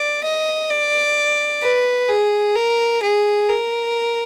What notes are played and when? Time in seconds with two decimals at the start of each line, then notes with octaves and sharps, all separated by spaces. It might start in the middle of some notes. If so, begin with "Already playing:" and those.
Already playing: D5
0.23 D#5
0.70 D5
1.62 B4
2.08 G#4
2.56 A#4
3.02 G#4
3.49 A#4